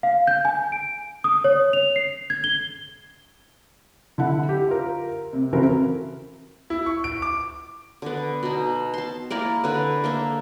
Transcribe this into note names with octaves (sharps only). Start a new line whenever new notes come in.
F5
G6
G#5
D7
D#6
C#5
F7
C7
G#6
G7
D3 E4 F#5
G4
F4 A#4
C3
C#3 E3 C4 F#4 A4 A#4
E4
C#6
D7
D6
D3 B3
B2 D#4
A5 C6
A#3 E4 A#4 D5
D3 B4
A#3 A4 E5